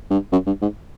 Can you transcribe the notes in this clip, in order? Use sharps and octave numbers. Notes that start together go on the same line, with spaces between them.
G2
F#2
G2
G#2